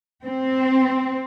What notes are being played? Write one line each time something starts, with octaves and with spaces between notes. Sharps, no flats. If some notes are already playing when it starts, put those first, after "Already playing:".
C4